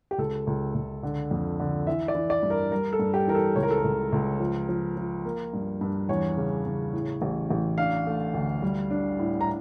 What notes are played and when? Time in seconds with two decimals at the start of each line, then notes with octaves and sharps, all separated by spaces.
0.11 G4
0.18 C#2 A4
0.47 C#2
0.74 C#2
1.03 D3
1.31 F2
1.59 D3
1.87 E3 E5
2.08 D5
2.15 E3
2.30 D5
2.43 G2
2.50 A#4
2.72 G3 A#4
2.93 A4
2.99 G2
3.14 G4
3.27 E3 A#4
3.35 A4
3.56 C#2 C#5
3.63 A#4
3.71 A4
3.78 A#4
3.84 C#2
4.12 C#2
4.40 F3
4.69 F3
4.97 F3
5.25 A#3
5.54 G2
5.81 G2
6.09 E2 C#5
6.37 C#3
6.66 C#3
6.93 A2
7.22 A1
7.51 A1
7.78 D4 F5
8.07 A3
8.34 D2
8.62 G3
8.90 D4
9.19 A2
9.41 A#5